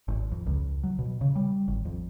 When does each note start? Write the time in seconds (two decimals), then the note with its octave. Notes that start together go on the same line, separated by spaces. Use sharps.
0.08 G#1
0.32 F2
0.46 C#2
0.83 F#3
0.99 B2
1.21 C#3
1.36 G3
1.68 G#1
1.85 F2